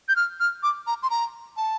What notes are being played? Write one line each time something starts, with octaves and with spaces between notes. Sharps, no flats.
G6
F6
F6
D6
A#5
C6
A#5
A5